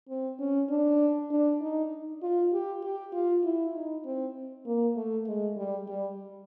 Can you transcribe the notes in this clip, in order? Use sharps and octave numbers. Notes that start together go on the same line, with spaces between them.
C4
C#4
D4
D4
D#4
F4
G4
G4
F4
E4
D#4
C4
A#3
A3
G#3
G3
G3